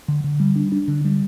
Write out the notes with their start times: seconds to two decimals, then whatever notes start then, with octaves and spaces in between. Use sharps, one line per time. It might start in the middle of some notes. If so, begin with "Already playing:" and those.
0.08 D3
0.24 D3
0.40 G3
0.56 D4
0.72 D4
0.88 D3
1.05 G3